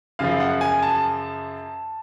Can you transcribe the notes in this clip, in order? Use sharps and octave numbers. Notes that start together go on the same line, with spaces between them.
F#2 C#3 F3 F5
F#5
G#5
A5